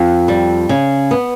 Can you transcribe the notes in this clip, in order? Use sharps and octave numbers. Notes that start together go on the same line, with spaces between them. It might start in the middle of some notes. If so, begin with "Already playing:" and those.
Already playing: F2
G3
C#3
B3